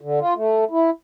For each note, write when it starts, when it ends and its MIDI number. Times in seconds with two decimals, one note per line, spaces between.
0.01 0.19 50
0.20 0.34 65
0.36 0.64 57
0.71 0.90 64